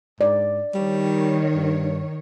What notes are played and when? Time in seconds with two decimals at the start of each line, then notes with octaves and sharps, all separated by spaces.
0.21 G#2 D5
0.75 D#3 G3 C#5
1.56 G2